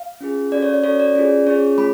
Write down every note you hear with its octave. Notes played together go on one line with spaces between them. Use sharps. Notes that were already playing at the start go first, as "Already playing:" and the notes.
Already playing: F5
C#4 F4 G#4
C#4 F#4 A4 D5
C#5
D5
C#4 F#4 A4 C#5
D5
C#4 F4 G#4
C#4 F4 G#4 C#5
A3 F4 B5